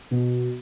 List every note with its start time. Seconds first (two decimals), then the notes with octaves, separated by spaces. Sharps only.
0.11 B2